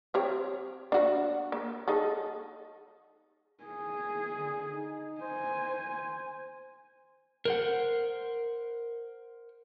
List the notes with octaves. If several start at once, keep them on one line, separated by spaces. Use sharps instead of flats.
C4 G4 C#5
D4 F#4 F5
A#3
D#4 G#4 A4
G#4
D3
D#4
C5 G#5
C5
A#4 C5 F#5